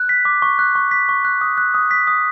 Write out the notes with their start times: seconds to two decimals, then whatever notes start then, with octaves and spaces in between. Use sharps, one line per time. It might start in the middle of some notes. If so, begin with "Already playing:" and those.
Already playing: F#6
0.09 B6
0.25 D6
0.42 C#6
0.59 F#6
0.75 C#6
0.91 B6
1.09 C#6
1.25 F#6
1.41 D#6
1.58 F#6
1.74 D#6
1.91 B6
2.07 D#6